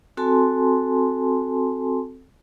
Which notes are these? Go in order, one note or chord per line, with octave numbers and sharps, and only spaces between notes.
C4 F#4 A4 G#5 A5 C6